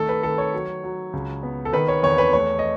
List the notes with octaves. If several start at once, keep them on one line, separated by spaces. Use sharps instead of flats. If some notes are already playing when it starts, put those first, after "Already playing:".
Already playing: D#3 A3 A4
B4
D#3 A4
C#5
F#3
F#3
C#2
B3
A4
D#3 B4
C#5
E2 C#5
B4
A3 C#5
D#5